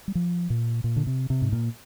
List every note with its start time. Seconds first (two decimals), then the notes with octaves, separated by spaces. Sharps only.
0.08 G3
0.15 F3
0.50 A#2
0.84 A#2
0.96 D3
1.07 C3
1.30 C3
1.42 G#2
1.52 A#2